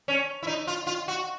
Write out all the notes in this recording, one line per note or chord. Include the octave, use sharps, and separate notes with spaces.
C#4
E4
D#4
F4
F4
F#4